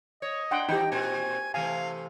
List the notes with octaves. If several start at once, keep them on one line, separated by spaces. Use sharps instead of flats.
C#5 D#5
D4 F#5 G5 C6
E3 D#4 G4 G5
A#2 C4 F#4 G#5
C3 E3 A3 F5 G#5